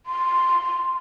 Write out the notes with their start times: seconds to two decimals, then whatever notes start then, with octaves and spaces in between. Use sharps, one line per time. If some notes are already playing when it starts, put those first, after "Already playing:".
0.06 C6